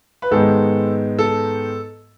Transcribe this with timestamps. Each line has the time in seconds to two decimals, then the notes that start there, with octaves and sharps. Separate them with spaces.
0.22 B4
0.31 G#2 D#3 G#3 B3 A4
1.19 A4